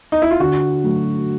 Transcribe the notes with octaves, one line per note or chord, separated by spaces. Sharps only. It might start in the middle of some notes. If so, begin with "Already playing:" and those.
D#4
E4
F4
D3 F#4
F#3 A3